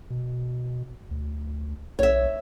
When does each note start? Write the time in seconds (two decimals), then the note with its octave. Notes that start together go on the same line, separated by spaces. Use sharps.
0.10 B2
1.11 D2
1.99 B1 C#5 E5